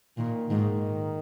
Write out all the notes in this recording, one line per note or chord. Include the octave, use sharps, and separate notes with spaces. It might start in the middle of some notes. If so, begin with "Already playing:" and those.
A#2 D#3
G#2 D#3